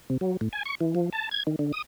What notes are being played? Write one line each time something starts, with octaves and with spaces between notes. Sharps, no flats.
C3
F#3
A2
G#5
C#6
E3
F3
A5
G#6
D#3
D3
D#6